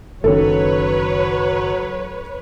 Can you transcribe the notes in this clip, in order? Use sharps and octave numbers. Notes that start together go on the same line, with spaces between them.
F#1 D#3 F#3 C#4 A4 B4 C#5